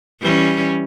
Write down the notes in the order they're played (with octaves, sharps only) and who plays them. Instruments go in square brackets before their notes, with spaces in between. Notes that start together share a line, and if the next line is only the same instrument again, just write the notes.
[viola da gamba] E3 G3 C#4